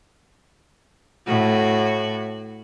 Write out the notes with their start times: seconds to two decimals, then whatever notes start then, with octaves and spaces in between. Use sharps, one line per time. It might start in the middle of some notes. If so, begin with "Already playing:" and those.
1.27 A2 F#4